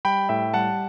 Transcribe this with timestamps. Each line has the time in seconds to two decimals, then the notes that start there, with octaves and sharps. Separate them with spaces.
0.05 G3 G5 B5
0.29 A2 E5 G5
0.54 G3 F#5 A5